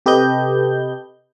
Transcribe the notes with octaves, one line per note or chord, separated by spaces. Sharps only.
C3 G4 A4 B4 D#5 G6